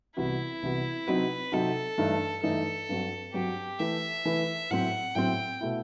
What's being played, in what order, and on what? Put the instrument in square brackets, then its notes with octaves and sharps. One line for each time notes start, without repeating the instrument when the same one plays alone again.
[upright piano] C2 C3 E3 B3 F#4 [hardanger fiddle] E4
[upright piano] C2 C3 E3 B3 F#4
[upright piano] C3 F#3 C4 D#4 F#4 [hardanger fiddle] B4
[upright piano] C3 F#3 C4 D#4 F#4 [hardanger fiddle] A4
[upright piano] G2 E3 A3 D#4
[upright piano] G2 E3 A3 D#4 [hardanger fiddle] A4
[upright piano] G2 F#3 C4 F#4
[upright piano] G2 F#3 C4 F#4 [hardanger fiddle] G4
[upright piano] E3 A3 E4 B4 [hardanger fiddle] E5
[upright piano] E3 A3 E4 B4
[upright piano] A2 F#3 C4 [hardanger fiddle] F#5
[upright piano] A2 F#3 C4 [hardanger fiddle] G5
[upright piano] B2 A3 E4